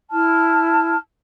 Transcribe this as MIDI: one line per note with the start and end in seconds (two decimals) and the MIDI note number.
0.10 0.96 64
0.10 0.96 81
0.10 0.96 89